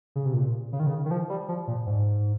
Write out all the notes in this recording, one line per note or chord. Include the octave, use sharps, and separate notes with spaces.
C#3
C3
A#2
C#3
D#3
C#3
D#3
F3
G3
F3
A#2
G#2